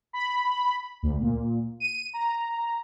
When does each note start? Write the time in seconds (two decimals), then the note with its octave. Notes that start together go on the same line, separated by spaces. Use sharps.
0.13 B5
1.03 D2
1.21 A#2
1.80 D#7
2.14 A#5